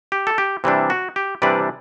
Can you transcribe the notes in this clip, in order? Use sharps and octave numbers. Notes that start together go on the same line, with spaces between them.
G4
A4
G4
C3 E3 G3 D4
F#4
G4
C3 E3 G3 D4 B4 D5